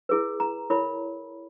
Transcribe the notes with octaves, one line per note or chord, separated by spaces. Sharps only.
E4 G#4 B4
A#5
E4 A#4 C#5 B5